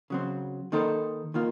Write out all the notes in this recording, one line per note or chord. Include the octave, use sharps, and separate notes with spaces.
C#3 F#3 C4
D#3 A#3 D#4 A4 C5
D#3 A#3 F4